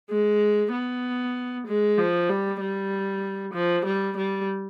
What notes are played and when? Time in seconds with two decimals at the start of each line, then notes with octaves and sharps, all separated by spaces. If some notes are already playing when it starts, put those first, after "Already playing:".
0.10 G#3
0.72 B3
1.67 G#3
1.98 F3
2.29 G3
2.60 G3
3.54 F3
3.85 G3
4.17 G3